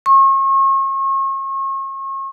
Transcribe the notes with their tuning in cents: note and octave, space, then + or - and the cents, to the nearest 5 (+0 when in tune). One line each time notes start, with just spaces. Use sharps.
C#6 -40